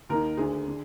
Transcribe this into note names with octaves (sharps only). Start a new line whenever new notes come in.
D#2 D#3 A#4
D2 D3 G#4
D3